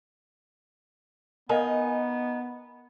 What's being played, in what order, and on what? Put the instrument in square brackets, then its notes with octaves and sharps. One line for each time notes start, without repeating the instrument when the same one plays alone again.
[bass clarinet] B3 [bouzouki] D#4 [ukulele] A#4 D#5 F5 [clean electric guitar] G#5